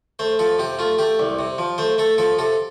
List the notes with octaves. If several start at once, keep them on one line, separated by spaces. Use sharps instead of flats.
A3 C5
F3 A4
C3 G4
A3 F4
A3 G4
C2
C3
F3
A3 C5
A3 A4
F3 A4
C3 A4